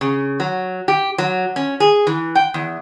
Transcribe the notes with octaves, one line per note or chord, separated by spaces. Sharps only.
C#3
F#3
G4
F#3
C#4
G#4
E3
G5
E2